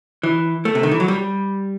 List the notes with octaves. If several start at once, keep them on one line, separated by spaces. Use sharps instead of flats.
E3
A3
C3
D#3
E3
F#3
G3